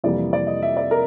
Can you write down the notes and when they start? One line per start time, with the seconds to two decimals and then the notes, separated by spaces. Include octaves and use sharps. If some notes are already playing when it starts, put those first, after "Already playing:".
0.04 F2 C3 E3 G3 A#3 D5
0.33 D5
0.47 D#5
0.62 E5
0.77 D5
0.91 A#4